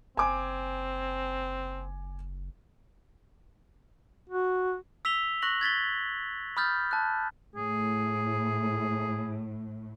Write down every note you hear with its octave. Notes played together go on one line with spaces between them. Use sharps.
F#1 C4 G#5 D6
F#4
E6 B6 F7 G7
C#6 F#6 A#6 F#7
G#6 A6 B6 G7
B5 D#6 F6 G6 A6
A5 F#6
A2 G#4